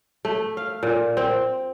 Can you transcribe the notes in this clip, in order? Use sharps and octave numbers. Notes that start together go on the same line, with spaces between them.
A3
F5
A#2
C4